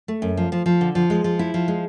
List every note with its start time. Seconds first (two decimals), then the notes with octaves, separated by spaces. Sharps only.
0.08 A3
0.22 F#2
0.37 F3
0.52 F3
0.66 F3
0.81 D3
0.95 F3
1.10 G#3
1.24 F3
1.39 E4
1.54 F3
1.68 G#3